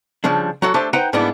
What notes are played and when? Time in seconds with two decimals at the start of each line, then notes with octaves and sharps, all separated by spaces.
0.24 C#3 F3 G3 D4
0.62 F#3 F#4 A4
0.74 A3 D4 G4 A4 C5
0.93 D#4 B4 C5 F#5 G5 A#5
1.13 G#2 G3 A#3 B3 D4 E4